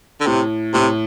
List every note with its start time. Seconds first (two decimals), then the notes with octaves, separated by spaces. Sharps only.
0.21 D3
0.27 A2 C3
0.74 A2 C3